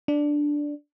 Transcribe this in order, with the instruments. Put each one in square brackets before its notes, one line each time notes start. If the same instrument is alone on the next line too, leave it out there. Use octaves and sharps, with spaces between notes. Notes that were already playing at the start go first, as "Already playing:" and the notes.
[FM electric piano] D4